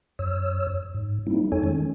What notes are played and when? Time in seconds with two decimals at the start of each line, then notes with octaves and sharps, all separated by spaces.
0.19 F#2 C#5 E6
0.95 G#2
1.27 G3 A#3 C4 D#4 E4
1.52 F2 D#4 A4 C#5 G#5
1.63 D#3 G#3 C#4